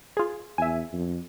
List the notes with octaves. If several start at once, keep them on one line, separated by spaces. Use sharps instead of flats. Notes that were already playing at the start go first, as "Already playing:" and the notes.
F4 G#4
E2 E5 G#5
F2